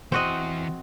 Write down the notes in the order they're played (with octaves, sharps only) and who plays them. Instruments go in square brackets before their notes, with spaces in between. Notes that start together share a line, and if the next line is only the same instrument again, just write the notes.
[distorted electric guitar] E3 F#5 [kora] C4 F#4 D#5